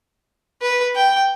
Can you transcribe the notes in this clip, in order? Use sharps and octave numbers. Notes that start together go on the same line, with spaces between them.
B4
G5